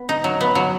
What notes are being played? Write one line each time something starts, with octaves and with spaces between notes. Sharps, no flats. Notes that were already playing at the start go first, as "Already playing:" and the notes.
Already playing: B3
D#4
F#3
B3
F#3